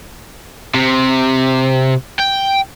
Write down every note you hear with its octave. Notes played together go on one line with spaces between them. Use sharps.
C3
G5